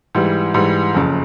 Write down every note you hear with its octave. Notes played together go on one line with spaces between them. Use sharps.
G#2 E3 G3
G#2 E3 G3
F#1 F2 C#3